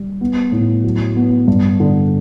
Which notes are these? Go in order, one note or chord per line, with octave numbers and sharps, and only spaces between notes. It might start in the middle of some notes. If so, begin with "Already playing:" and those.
Already playing: G3
B3
A2
F#3
B3
G2
D3